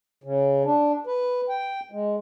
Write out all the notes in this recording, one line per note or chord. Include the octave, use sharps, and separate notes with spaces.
C#3
D4
B4
G5
G#3